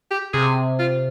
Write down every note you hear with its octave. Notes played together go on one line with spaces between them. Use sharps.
G4
C3 G#4
F4